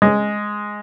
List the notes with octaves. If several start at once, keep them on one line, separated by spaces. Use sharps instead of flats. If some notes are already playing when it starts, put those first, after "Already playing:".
G#3